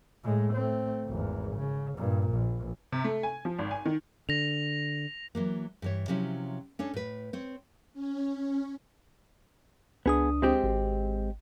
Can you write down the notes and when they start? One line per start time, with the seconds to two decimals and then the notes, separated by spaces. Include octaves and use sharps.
0.24 A2 G#3
0.54 A3 C4
1.07 G#1 E2
1.56 C#3
1.97 G2 A#2
2.31 A#1
2.92 C3
3.04 A3
3.23 G#5
3.45 F3
3.59 G#1
3.71 G#5
3.85 D#3
4.29 D3 A#6 F7
5.35 E3 F#3 A#3
5.82 G2 E3 C#5
6.08 C3 F3 F#3 C#4 E4
6.79 C#4 D4 A4 C#5
6.94 A2 B4
7.33 C4 C#5
7.93 C#4
10.06 C#2 B3 D4 G#4 D#6
10.42 G#3 C4 G4
10.64 G#1